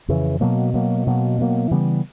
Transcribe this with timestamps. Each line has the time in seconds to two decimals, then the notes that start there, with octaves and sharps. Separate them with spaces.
0.08 F2 C#3 E3
0.41 B2 F#3 A#3
0.73 B2 F#3 A#3
1.06 B2 F#3 A#3
1.38 B2 F#3 A#3
1.71 C#3 E3 G3 B3